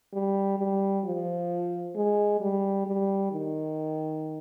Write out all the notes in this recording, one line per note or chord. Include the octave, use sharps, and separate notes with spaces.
G3
G3
F3
G#3
G3
G3
D#3